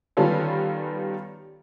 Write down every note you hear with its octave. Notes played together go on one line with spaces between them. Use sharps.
D#3 G3 B3 C#4 F4 A4